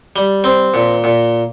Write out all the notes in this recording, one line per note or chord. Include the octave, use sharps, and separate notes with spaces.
G3
C4
A#2
A#2